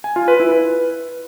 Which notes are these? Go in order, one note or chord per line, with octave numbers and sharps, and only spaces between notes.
G#5
F4
B4
E4
B4